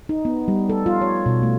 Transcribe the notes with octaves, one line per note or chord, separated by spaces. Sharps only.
D#4
B3
G3
A4
F4
C#5
B2
A3